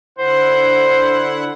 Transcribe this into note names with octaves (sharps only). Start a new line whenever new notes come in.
D3 E4 C5 F#5